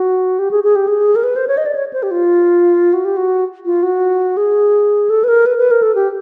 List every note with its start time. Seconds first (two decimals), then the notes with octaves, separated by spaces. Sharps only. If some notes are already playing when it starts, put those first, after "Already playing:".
Already playing: F#4
0.39 G4
0.51 G#4
0.63 G#4
0.75 G4
0.87 G#4
1.15 A#4
1.23 B4
1.36 C5
1.48 C#5
1.57 D#5
1.66 D5
1.75 C#5
1.93 C5
2.03 G4
2.11 F4
2.93 F#4
3.05 G4
3.17 F#4
3.65 F4
3.83 F#4
4.37 G#4
5.09 A4
5.24 B4
5.28 A#4
5.46 B4
5.58 B4
5.71 A#4
5.82 A4
5.95 G4